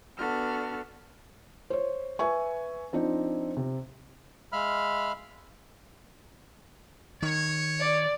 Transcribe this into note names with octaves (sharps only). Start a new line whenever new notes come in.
B3 D4 F#4 A4 F6
C5 C#5
B4 E5 G#5 C#6
F3 C4 D4 D#4
C3
G#3 E5 F5 B5 F6
D#3 C#5
D5